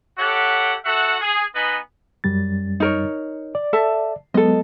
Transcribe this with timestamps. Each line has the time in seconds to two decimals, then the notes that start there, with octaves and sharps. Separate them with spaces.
0.18 G4 A4 C#5 E5 F#5
0.85 F#4 A4 E5 F#5
1.21 G#4
1.55 B3 D#4 B4 D#5 G#5 B5
2.24 F#2 G3 A6
2.80 D#4 A#4 C#5
3.55 D5
3.73 A4 E5 A5
4.34 F#3 G#3 B3 A4 D#5